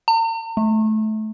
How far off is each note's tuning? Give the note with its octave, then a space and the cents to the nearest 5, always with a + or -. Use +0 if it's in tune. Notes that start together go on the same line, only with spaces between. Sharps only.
A#5 -45
A3 -20